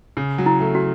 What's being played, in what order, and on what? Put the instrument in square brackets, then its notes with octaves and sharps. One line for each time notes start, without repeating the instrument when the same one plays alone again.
[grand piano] C#3
F#3
[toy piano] E4
[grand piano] A3
[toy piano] F#4